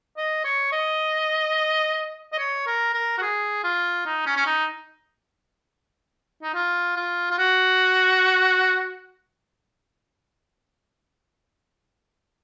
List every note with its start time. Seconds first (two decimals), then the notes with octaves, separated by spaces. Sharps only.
0.17 D#5
0.45 C#5
0.72 D#5
2.33 D#5
2.39 C#5
2.67 A#4
2.94 A#4
3.18 F#4
3.22 G#4
3.64 F4
4.05 D#4
4.26 C#4
4.37 C#4
4.46 D#4
6.43 D#4
6.55 F4
6.96 F4
7.30 F4
7.38 F#4